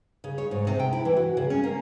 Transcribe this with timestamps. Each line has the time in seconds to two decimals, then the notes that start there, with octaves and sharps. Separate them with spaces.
0.24 C#3
0.38 C#5
0.51 G#2
0.67 C3
0.79 G5
0.93 E4
1.05 E3
1.16 F#4
1.37 C#3
1.50 C#4
1.63 A#3